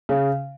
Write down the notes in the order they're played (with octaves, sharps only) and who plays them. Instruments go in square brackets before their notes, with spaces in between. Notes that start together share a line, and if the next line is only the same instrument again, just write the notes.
[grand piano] C#3